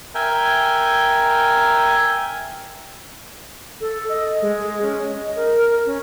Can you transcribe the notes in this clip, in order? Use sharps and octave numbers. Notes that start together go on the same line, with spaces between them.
A#4 E5 G5 G#5
A4
D#5
G#3
C#4
D#5
A#4
C#4